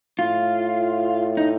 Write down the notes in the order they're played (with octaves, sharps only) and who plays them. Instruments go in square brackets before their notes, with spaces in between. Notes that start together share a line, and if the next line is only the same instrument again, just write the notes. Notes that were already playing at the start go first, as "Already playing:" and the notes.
[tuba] A2 [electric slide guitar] F4
[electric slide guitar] D#4